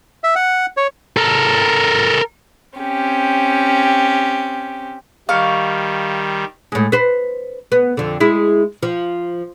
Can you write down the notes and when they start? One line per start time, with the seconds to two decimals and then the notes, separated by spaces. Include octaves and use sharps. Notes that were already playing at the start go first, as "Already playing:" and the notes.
0.24 E5
0.36 F#5
0.77 C#5
1.17 A4 A#4
2.77 C4 C#4 G4
5.29 D#3 G3 F5 C#6
6.72 A2 G#3
6.92 B4 C5
7.72 B3
7.97 F2 D3
8.20 G#3 E4
8.83 F3